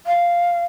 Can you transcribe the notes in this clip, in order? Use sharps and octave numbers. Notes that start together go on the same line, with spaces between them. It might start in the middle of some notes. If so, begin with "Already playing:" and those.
F5